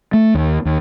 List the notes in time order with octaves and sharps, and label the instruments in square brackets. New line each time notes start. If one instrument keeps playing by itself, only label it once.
[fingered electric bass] A3
D#2
D#2